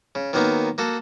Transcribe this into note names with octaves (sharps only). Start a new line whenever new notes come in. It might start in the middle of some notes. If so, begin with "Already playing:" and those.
C#3
D#3 F#3 A#3 B3 D#4
A#3 F#4 A4